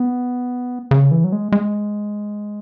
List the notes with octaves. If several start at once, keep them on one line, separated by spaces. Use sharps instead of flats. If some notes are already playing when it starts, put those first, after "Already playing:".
Already playing: B3
C#3
E3
F#3
G#3
G#3